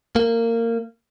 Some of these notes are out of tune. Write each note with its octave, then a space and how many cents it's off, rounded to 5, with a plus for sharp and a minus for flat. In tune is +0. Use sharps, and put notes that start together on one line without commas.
A#3 -20